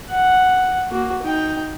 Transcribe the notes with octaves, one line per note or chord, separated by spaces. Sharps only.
F#5
A#3 F#4
D#4 G5